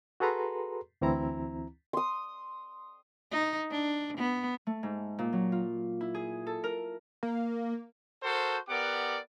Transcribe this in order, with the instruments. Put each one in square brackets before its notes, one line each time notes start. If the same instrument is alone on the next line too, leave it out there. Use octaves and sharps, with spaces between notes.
[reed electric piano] F#4 G#4 A4 B4 A#5 C6
D2 E3 C4 E4 A#5
[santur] C6 D#6
[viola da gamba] D#4
D4
B3
[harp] A3
G#2
A#2
F#3
F4
E4
G#4
A4
A#4
[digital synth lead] A#3
[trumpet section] F#4 A4 A#4 C5
B3 G4 A#4 D5 F#5 D6